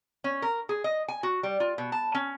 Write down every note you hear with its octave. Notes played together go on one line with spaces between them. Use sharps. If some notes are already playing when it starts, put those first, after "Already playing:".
C#4
A#4
G#4
D#5
G#5
F#4
G3
F4
B2
A5
C#4